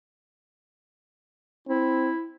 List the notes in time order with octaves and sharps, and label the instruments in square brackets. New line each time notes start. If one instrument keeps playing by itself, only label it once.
[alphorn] C4 [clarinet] E4